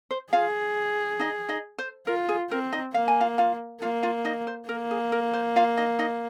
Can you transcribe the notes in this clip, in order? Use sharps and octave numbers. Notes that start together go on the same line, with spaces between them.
C5
F4 G#4 F5
D#4 D#5
D#4 D#5
C5
F4 A#4
G#4
C4 A#4
D#4 D#5
A#3 F5
G#5
F4 F5
F4 F5
A#3 F4 F5
F4 F5
D#4 D#5
C5
A#3 A#4
G#4
A#4
C5
F4 F5
D#4 D#5
D#4 D#5